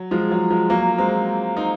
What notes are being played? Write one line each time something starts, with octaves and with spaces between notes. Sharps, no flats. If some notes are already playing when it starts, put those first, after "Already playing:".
Already playing: F#3
F3 G#3
F#3
F3 G#3
F#3 A#3
G#3 C4
C4 D#4